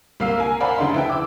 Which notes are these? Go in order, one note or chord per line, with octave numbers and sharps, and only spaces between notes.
C2 A#3 F5 E6 C7
A#4 G#5
A#4 C5 D5 F5 F#5 B5
F1 D2 C#3 D#4 C6
E4 B4 G5
D6 E6